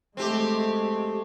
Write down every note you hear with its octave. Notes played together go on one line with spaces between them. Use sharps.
G#3 A3 C4 G4